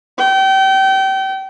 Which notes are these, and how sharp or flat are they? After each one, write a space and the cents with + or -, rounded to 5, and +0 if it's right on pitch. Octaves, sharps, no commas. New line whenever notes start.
G5 -30